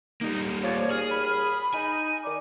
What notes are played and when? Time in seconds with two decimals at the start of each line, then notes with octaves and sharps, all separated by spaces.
0.21 G3 A#3 D#4
0.63 F3 C#5 D5
0.91 D#2 G#4 F6
1.11 B5
1.74 D#4 G#5
2.25 D#3 D5 D6